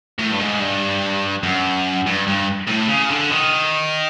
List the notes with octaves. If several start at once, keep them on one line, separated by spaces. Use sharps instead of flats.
A2
G2
G#2
G2
F#2
G2
G2
A2
C#3
D3
D#3